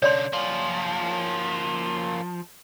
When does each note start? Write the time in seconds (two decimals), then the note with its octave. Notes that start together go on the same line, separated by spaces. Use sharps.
0.02 C#3 D4 C#5 D5 C6
0.33 F3 A#3 C#4